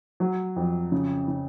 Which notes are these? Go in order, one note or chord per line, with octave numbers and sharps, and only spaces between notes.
F#3
F2
C#3
C#3